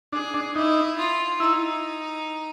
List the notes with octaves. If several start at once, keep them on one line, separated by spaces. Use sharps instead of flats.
D4 G#4
D4
D#4 E4
F4
D#4 E4